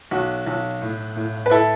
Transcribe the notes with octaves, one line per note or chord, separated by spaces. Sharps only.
B1 F#4
B1
A2
A2
B4
E4 A4